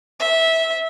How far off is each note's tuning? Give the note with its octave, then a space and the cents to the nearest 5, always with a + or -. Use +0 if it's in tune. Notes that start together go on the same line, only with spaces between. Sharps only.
E5 -15